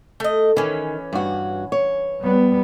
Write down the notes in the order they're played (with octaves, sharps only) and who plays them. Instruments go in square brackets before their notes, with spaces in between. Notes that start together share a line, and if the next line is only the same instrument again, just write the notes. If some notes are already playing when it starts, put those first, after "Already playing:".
[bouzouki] A3 D#5
[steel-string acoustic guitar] D#3 [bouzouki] E3 C#4
[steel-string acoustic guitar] G2 F#4
C#5
[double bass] G3 B3